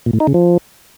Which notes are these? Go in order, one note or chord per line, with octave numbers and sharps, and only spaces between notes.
A#2
A2
D#4
C#3
F3